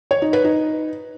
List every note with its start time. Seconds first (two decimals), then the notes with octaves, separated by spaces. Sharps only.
0.11 C#5
0.22 D#4
0.33 B4
0.44 D#4